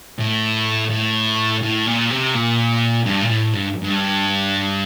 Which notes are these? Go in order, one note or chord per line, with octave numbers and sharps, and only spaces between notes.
A2
A2
A2
A#2
C3
A#2
G2
A#2
A2
G2
G2